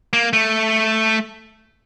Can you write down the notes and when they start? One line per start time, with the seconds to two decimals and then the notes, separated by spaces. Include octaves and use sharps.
0.13 A#3
0.33 A3